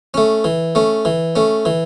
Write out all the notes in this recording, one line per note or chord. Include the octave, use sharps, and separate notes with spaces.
A3 C#4
E3
A3 C#4
E3
A3 C#4
E3